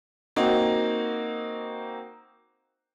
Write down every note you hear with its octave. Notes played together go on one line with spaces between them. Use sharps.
A#3 C4 D#4 F#4